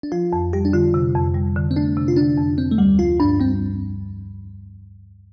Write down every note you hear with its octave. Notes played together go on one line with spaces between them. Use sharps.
D4
F3 F4
F2
G3 G4
D4
D3 F4
C3
F2
G3
D3
C4
A3 D4
C3
F4
D3 D4
F2
D3 C4
A3
D2 G3
F3 F4
G2 D4
G3 C4